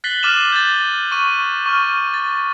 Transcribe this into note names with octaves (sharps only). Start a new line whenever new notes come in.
F#6 A6 B6 C7 F#7 G7
D6 F6 A6 D#7 E7 F#7
G6 A6
C#6 D#7
C#6 F6
A6